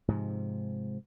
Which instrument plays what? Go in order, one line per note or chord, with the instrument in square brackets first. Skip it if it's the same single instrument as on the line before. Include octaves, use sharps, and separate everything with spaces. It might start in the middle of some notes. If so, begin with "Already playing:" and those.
[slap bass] G#2 C3 F3